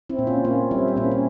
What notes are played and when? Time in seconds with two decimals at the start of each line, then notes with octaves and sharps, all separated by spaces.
0.09 C4 E4
0.19 A#2
0.27 C#4 F4
0.44 A#3 C#4 F4
0.71 G3 C4 E4
0.88 E4
0.96 A#2 A#3 C#4
1.11 C#4